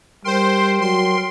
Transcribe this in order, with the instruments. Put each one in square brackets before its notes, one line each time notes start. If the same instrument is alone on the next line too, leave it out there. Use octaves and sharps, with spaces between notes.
[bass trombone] G3 [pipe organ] A#4 G5 [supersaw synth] C5 C6
[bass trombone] F#3 [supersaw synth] C6